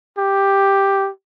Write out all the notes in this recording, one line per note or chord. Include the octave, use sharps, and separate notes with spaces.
G4